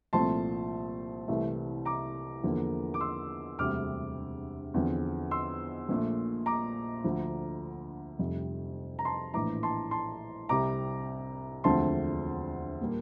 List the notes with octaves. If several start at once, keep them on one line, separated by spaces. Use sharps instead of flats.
C2 A#2 F3 A3 C4 A5 C6
C2 C3 E3 A3
A#5 D6
E2 D3 F3 A#3
D6
C6 E6
E1 D2 C3 G3 D6 F6
E2 D3 F3 C4
C6 E6
A#1 A#2 A3
A#5 D6
D2 D3 F3
F1 F2 C3 G3
A#5
A5 C6
A#1 A2 E3 A#5 D6
A5 C6
A5 C6
C2 C3 G3 A#5 D6
E1 D2 D3 F3 C4 A5 C6
A#2 G3 A#3